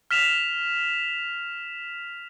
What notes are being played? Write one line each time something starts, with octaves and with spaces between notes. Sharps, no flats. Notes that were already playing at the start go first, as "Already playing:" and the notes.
F6 B6 E7 F7